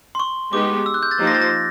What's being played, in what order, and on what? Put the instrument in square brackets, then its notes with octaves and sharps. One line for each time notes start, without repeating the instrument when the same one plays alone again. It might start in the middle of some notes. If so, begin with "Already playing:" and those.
[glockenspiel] C6
C#6
[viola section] G#3 B3 D#4 G4 [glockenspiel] D6
[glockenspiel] E6
F#6
G6
A6
[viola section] F3 A#3 D#4 G4 C5
[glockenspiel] A#6
A6
A#6